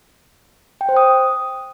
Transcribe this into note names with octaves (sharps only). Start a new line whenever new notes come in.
G5
C5
D#6